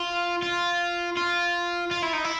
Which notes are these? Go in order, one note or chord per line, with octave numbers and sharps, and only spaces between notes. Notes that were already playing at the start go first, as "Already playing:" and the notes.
Already playing: F4
F4
F4
F4
E4
D#4
E4